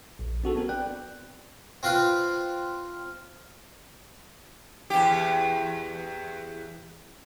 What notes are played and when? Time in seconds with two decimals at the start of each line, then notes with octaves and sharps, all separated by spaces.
0.19 A#1
0.44 C4 D4 F#4 G#4 A4
0.55 B3 C4 F#4 A#4
0.69 B4 D5 G5 F#6
1.83 C4 F4 B4 F5
4.90 E2 G4